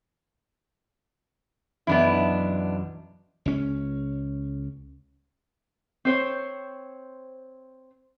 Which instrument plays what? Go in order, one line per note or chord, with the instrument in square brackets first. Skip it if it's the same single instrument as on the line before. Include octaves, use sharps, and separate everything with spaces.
[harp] B1 F#2 E3 [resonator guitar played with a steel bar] B3 D4 E4
[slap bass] C#2 C#4
[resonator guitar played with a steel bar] C4 C5 C#5